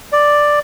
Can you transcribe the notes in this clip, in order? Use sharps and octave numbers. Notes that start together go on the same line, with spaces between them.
D5